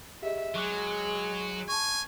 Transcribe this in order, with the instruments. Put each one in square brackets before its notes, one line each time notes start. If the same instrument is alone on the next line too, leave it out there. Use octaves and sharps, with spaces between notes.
[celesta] G4 G#4 D#5 [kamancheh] E5
[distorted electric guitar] F#3 [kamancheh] G#3 [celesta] C#6 D6 F#6
[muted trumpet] G#5 [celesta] A5 C#6